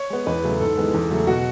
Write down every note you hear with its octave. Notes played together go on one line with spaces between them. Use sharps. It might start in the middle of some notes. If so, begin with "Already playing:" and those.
Already playing: C#5
G#3 B3
E2 B4
C#3 F#3 A3
G#2 A4
E3 G#3 B3
E2
C#3 F#3 A3
B2 F#4